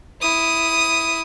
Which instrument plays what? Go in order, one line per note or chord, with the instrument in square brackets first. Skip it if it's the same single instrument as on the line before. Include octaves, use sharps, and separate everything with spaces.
[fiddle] E4 D#6